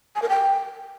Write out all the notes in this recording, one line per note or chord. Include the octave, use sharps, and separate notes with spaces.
G#5
A#4
G5